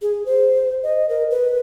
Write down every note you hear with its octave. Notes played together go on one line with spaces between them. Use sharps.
G#4
C5
D#5
A#4
B4